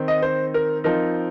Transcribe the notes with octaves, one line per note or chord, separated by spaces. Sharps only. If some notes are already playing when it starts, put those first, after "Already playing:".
Already playing: D#3 C4 D#4
D#5
C5
A#4
F3 C4 D#4 A#4